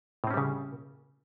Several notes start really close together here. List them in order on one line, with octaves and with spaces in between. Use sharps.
A2 C4 C#4 G3 C#3